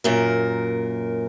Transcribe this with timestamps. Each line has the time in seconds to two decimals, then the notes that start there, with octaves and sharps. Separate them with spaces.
0.04 F#2 A#2 A#4